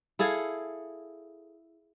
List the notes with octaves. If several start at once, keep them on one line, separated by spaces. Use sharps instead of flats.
E4 G#4 A4 F5